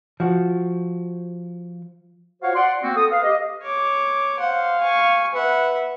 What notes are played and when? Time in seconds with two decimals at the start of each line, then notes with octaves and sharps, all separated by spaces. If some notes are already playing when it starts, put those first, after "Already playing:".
0.20 F3 F#4
2.42 F4 F#4 C5 C#5 F5 F#5
2.55 D5 F#5 C6
2.83 A#3 C4 F#4
2.96 A4 D#6
3.11 B4 F5
3.24 G4 D#5
3.63 C#5 D6
4.40 C5 F5 F#5
4.81 G#5 C#6
5.35 B4 E5 F#5